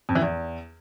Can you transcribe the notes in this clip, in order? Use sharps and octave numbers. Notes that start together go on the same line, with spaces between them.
F2
E3
E2